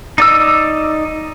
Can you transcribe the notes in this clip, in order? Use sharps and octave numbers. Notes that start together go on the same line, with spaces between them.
D#4 D5 E6